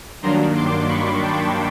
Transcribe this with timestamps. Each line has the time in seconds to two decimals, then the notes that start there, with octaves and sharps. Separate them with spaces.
0.22 G2 D#3 F#3 A#3 D4 A#5 C6
0.55 C6 D6
0.88 B5 C#6
1.22 G5 A5